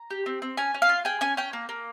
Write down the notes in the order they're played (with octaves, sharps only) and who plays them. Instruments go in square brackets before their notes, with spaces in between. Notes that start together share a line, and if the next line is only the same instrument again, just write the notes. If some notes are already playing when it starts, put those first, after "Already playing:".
Already playing: [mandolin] A#5
G4
C4
C4
C#4 G#5
C#4
F5
F4
G#4 G5
C#4 G#5
C#4 G5
A#3
A#3